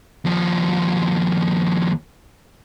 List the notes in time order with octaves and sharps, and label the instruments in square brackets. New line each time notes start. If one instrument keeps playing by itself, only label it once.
[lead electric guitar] D#2 F3